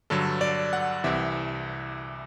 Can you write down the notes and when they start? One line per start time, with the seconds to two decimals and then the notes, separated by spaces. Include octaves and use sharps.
0.10 G2 D3 F#3 A4
0.41 D5
0.73 F#5
1.04 C2 C3 E3 E5